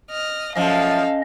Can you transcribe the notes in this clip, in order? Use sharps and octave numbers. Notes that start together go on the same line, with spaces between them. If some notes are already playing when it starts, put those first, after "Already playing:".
D#5 F6
F#2 F3 C#4 A4 D#5 F5